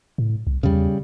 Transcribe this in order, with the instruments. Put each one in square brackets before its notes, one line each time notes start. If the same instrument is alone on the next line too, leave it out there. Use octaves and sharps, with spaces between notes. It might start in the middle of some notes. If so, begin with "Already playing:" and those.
[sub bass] A2
C2
[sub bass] E2 [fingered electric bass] C#3 G3